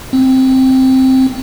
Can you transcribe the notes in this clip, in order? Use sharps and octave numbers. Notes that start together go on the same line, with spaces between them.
C4